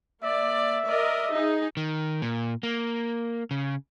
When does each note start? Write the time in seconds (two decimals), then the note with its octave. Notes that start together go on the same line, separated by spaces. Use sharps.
0.23 A#3 D5 E5
0.87 A#4 D5 D#5
1.32 D#4 G#4
1.77 D#3
2.22 A#2
2.63 A#3
3.51 C#3